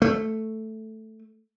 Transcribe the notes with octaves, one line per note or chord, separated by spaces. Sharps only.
A3